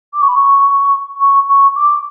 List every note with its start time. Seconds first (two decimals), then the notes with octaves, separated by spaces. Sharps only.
0.13 D6
0.22 C#6
0.28 B5
0.36 C#6
1.21 C#6
1.49 C#6
1.75 D6